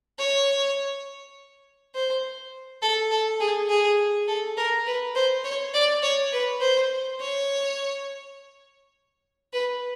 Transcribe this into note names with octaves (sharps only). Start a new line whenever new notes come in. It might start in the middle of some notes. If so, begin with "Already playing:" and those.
C#5
C5
A4
A4
G#4
G#4
A4
A#4
B4
C5
C#5
D5
C#5
B4
C5
C#5
B4